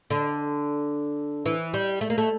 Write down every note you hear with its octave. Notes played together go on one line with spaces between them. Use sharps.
D3
E3
G3
A3
A#3
A3